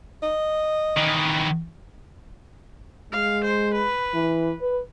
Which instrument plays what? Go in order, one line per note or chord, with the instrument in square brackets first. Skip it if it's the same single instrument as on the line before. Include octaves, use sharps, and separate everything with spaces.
[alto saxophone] D#5
[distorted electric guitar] D#3 E3
[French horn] G#3 [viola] F5
[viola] C5
B4
[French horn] E3
B4